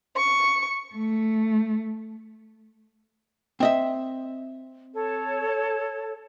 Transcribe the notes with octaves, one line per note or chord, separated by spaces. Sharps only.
C#6
A3
C4 D#5 E5
A4 C#5